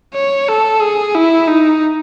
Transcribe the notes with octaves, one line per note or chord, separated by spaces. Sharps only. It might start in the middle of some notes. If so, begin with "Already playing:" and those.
C#5
A4
G#4
E4
D#4